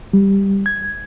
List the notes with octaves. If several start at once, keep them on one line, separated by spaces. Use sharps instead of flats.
G3
G#6